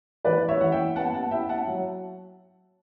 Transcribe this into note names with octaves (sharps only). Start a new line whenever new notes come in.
E3 B4 D5
C#5 E5
E3 F#5
E5 G5
B3 F#5 A5
F#5 A5
E4 E5 G5
F#5 A5
F#3